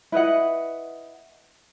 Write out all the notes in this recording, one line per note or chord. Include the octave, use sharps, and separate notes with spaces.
E4 B4 D#5 F#5